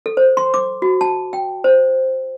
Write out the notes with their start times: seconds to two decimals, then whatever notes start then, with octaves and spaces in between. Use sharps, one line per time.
0.06 A4
0.17 C5
0.37 C6
0.54 D6
0.82 F#4
1.01 A5
1.33 G5
1.64 C5